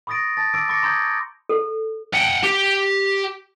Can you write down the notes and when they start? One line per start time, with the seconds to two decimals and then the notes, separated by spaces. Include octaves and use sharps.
0.07 B5 C#6 D#6 A6 A#6 D7
0.37 A5 A6
0.54 D6 E6 A6 D7
0.69 B5 C#6 D6 A6 A#6 C#7
0.83 A#5 C6 D#6 G6 G#6
1.49 A4
2.14 F#5 G5
2.43 G4